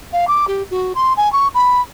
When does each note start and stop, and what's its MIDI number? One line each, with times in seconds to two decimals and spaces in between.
0.13 0.25 77
0.27 0.45 86
0.47 0.63 67
0.70 0.93 66
0.95 1.13 84
1.17 1.31 80
1.32 1.48 85
1.54 1.81 83